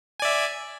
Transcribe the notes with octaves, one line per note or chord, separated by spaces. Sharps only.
D5 E5 G#5